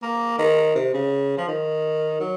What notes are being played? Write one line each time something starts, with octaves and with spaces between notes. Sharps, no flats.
A#3
D#3
C3
C#3
F3
D#3
F#3